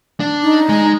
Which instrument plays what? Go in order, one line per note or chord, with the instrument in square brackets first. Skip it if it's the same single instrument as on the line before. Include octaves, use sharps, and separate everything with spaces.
[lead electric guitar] D4
[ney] D#4
[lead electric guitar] G#3